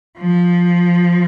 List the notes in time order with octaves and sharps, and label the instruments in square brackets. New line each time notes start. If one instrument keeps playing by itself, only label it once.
[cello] F3